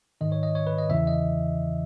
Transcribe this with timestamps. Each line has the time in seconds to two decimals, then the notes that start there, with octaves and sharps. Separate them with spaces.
0.21 G#2 D#3 D#5
0.32 C#5
0.43 D#5
0.55 C#5
0.67 B4
0.78 D#5
0.89 E2 C#3 E3 E5
1.07 D#5